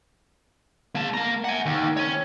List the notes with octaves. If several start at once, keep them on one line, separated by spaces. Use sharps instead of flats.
A#3 A5
A#3 A#5
F#5 G#5
D#2
C#5 G#5